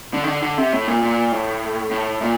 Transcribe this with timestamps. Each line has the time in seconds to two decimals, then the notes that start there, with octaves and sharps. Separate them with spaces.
0.14 D3
0.24 D#3
0.28 D3
0.43 D3
0.58 C3
0.73 A2
0.88 A#2
1.02 A#2
1.32 A2
1.91 A2
2.22 A#2